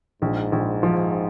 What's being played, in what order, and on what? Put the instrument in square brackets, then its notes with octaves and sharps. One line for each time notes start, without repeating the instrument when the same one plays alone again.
[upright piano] A#1 [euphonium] G#2
[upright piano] A#1
F3